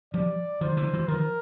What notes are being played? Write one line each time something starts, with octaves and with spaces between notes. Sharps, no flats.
F3 G3 D5
D#3 F3 C5
D3 E3
E3 F#3
D#3 F3 A#4